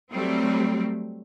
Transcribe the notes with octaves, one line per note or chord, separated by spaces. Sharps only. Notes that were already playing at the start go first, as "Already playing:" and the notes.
F#3 G3 A3 C4